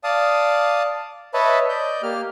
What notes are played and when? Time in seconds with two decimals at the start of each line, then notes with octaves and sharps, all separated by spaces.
0.04 D5 F5 A5 D#6
1.34 B4 C#5 D#5 E5 A5 B5
1.69 D5 D#5 G6
2.03 A#3 G4 F6